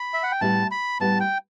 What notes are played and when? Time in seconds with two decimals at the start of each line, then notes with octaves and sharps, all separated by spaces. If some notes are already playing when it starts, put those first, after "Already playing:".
Already playing: B5
0.14 E5
0.23 F#5
0.32 G5
0.41 A2 G3 B3 E4 A5
0.71 B5
1.00 A2 G3 B3 E4 A5
1.20 G5